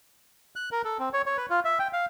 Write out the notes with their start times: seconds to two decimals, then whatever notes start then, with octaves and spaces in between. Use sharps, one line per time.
0.56 F#6
0.72 A#4
0.85 A4
0.99 C4
1.13 C#5
1.26 C#5
1.37 B4
1.50 F4
1.65 E5
1.79 G5
1.93 F5